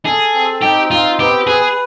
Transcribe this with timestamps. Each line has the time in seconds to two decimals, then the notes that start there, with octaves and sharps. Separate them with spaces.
0.06 G#4 A4
0.34 C4
0.62 D#4 G4
0.90 C4 F4
1.19 B3 G4
1.47 G#4 B4